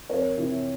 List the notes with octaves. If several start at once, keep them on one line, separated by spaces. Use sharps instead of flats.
F2 A#4 C#5
C3 E3